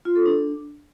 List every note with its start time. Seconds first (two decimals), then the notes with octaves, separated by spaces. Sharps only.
0.05 F4
0.15 A4
0.26 D4